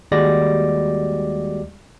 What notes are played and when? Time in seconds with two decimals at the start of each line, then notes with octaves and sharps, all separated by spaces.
0.12 D#2 G3 G#3 F#4 D5 A#6